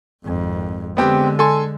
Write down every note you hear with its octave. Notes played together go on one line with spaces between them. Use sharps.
G#1 F2
D3 G#3 B3 C4 G4
A4 G#5 C6